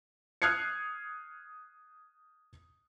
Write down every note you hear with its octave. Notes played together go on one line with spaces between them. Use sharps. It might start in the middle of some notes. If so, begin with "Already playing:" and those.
D#6 F6 F#6 G#6 C7 C#7